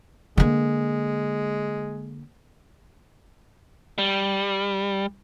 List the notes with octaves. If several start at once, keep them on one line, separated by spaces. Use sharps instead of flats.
D3 G#3 A#3
G3